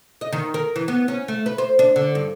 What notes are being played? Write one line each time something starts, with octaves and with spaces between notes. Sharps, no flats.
D#5
D#3
A#4
E3
B3
C#4
A3
B4
C5
D4
D3
G2